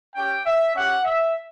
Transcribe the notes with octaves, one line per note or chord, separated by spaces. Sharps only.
C#4 G4 G5
E5
C#4 G4 F#5
E5